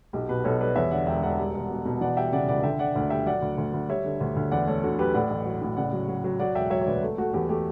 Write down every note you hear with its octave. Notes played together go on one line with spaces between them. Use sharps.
B1 G4
B2 G4 B4
B1 A4 C#5
G3 B4 D5
E2 C#5 E5
D3 D5 F#5
E1 E5 G5
E1 D5 F#5
G3
E1
B2
B2
E3 D5 F#5
G3 E5 G5
C#3 D5 F#5
C#2 D5 F#5
D3 E5 G5
D3 D5 F#5
D2 D5 F#5
G3 E5 G5
F#3 D5 F#5
D2
D2
D2
G3 C#5 E5
D3
D2
D2
E2 D5 F#5
A3 A4 C#5
D3 F#4 A4
F#3 G4 B4
A2 D5 F#5
A1
F#3
A2
C#3 D5 F#5
F#3
F#3
F#3
F#3 D5 F#5
E1 E5 G5
F#3 C#5 E5
C#5
D2 B4 D5
A3
A3 F#4
E2 G4
A3 G4